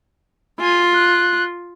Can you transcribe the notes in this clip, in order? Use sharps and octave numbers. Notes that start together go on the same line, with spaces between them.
F4 G#5
F#6